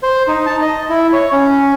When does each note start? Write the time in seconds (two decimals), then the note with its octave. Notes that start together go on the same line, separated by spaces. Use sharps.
0.03 C5
0.28 D#4
0.46 A5
0.62 D#5
0.89 E4
1.13 C#5
1.32 C#4